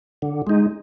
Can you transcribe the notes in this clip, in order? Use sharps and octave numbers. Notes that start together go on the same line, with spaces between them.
D3
G#3 D#4